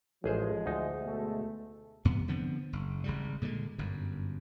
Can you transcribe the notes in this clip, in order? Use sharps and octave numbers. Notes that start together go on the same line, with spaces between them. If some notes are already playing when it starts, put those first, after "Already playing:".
A1 F3 G#3 G#4 C5
D2 D#4
B2 G#3 A3
E2 G2 C3 B3
D3 F3 B3 C4
F#1
G#1 C#3 G3
A#2 D3 F#3 G#3
G1 F#2